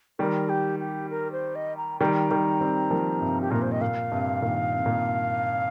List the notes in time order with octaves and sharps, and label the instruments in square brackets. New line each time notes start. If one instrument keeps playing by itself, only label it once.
[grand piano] D#3 G3 [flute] A#4
[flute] G4
G4
A#4
C5
D#5
A#5
[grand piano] D#3 G3 [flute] A#5
[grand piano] D#3 G3
G3 C4
F3 A#3
G2 C3
[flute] G4
[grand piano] A#2 [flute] A#4
[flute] C5
D#5
[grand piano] A#2 [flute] F5
[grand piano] G2 C3
A#2 D#3
C3
A#2